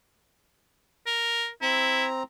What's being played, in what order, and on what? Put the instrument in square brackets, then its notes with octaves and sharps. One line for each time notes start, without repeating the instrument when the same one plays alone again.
[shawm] A#4
[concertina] C4 A#5 [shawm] E4